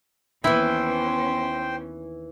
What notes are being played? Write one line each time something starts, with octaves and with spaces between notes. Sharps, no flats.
D#2 E3 B3 C#4 E4 C5 G5 C6